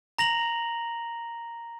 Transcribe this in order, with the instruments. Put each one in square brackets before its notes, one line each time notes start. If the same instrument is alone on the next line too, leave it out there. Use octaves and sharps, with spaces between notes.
[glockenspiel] A#5 A#6 F7 F#7